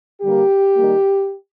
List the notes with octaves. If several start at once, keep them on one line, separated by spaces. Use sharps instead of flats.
D3 G3 A#3 G4
D#3 G3 A#3